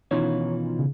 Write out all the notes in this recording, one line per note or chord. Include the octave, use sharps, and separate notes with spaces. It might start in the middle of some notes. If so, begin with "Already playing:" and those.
B2 D#3 E3 C#4 D#4 F4 C#5
C#3